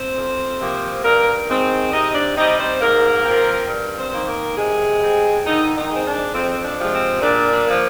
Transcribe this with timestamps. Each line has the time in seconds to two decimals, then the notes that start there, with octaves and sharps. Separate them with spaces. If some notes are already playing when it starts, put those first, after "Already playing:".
Already playing: C4 C5
0.15 F2
0.59 C3 F3 A#3
1.03 G2 A#3 A#4
1.47 D#3 G#3 C4
1.91 C3 D#4 D#5
2.14 D4 D5
2.35 G3 C4 D#4 D#5
2.58 C4 C5
2.79 G#2 A#3 A#4
3.24 F3 C4
3.68 G2
3.97 C4 C5
4.13 D#3 A#3
4.26 A#3 A#4
4.56 C3 G#3 G#4
5.00 G3 C4
5.45 D3 D#3 D#4
5.74 D#3 D#4
5.89 G#3 C4
6.04 D4
6.33 F2 C4
6.63 D4
6.78 C3 F3 G#3
6.93 C4
7.21 A#2 D4
7.50 D4
7.66 F3 A#3